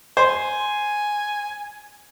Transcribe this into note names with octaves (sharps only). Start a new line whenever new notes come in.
C5 G#5